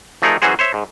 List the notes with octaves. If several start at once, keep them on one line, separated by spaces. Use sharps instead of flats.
F3 A3 D#4 G#4 A#4
E3 F#3 C#4 F#4 G#4 C5
C5 C#5 E5
G#2